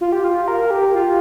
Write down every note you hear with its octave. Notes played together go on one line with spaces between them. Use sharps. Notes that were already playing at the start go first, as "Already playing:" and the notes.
F4
G4
F4
A#4
G4
F4